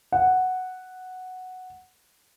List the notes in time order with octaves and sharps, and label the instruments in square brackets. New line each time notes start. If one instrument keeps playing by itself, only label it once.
[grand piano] F#5